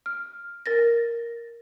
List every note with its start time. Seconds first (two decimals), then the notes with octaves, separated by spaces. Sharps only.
0.06 F6
0.66 A#4 A6 A#6